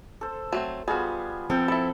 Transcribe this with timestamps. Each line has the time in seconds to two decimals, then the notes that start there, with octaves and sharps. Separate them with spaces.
0.21 A4 C5
0.53 F#3 A3 C4
0.88 G3 B3 F4 F#4 G#4
1.50 F3 C4 A4 G5
1.68 E4 A4 B5